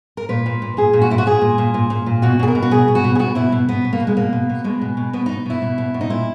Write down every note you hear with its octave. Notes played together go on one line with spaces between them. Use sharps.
A#4
A#2 B4
A#2
A#2
A#2 G#4
A#2
F#4
A#2 E4
F#4
A#2 G#4
A#2
A#2
A#2
A#2
A#2
B2 F#4
B2 G#4
A#4
B2
F#4
B2 G#4
B2
F#4
B2
G#4
B2 F#4
B2 E4
B2
B2 B3
B2
A#3
B2
G#3
B2 A#3
B2
B2
B2 G#3
B2
B2
B2 B3
B2 D#4
B2 E4
B2
B2
B2
D#4
A#2 E4